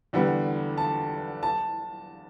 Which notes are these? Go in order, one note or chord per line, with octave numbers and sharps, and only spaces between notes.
E2 D3 G3 B3
A5
A5